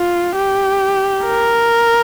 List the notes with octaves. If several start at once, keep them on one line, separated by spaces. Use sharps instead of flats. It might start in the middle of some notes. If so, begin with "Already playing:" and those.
Already playing: F4
G4
A#4